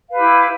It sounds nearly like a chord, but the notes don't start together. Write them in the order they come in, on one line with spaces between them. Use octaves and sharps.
F5 B4 G4 E4